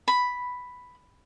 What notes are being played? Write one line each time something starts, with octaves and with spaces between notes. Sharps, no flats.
B5